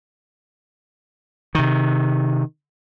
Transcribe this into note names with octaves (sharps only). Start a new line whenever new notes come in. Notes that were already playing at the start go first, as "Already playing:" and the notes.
C3 D#3